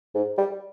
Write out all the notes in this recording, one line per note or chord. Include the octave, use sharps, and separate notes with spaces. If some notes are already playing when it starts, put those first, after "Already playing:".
G#2
G3